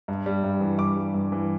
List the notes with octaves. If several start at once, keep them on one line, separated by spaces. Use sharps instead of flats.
G2
G3
G2
E3
G2 D6
G3
G2
E3